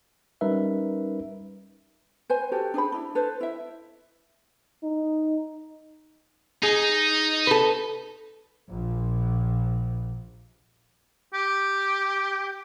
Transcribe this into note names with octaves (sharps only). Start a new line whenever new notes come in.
G3 C#4 D#4 A#4 B4 E5
B4 C5 G#5
F#4 G4 A4
D4 G#4 C5 B5
D4 E4
A4 B4 C5
E4 E5
D#4
D#4 G#4
A4 B4
A#1 A#2
G4